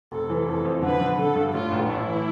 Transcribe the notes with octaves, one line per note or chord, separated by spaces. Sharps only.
F1 A4
E3
F2 A4
F2
D3 B4
D3
D3 A4
G2
A2 F4
A1
A2 E4
E3